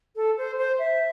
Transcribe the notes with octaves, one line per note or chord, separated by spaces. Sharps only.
A4
C5
C5
E5